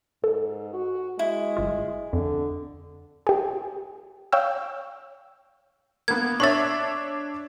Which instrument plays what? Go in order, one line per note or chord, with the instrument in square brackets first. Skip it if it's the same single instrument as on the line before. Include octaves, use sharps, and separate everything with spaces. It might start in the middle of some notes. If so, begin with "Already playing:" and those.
[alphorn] G#2 [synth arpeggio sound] A4
[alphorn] F#4
[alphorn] G#3 [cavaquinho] E4
[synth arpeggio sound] G1 F4
[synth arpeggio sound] F2 [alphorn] D3
[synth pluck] G4 G#4
C#5 F5 G5 E6
[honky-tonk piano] A#3 B3 [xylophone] G#6
[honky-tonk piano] D4 C#5 E5 [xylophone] C#6 A6